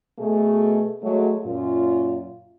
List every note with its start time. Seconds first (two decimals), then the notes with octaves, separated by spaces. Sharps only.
0.19 B2 A3 G#4
1.03 F#3 G#3 A3
1.45 F#2 A#2 F4